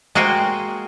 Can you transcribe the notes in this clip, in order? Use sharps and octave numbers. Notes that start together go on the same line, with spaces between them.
G#3 A#3 F#4 C5 G5 G#5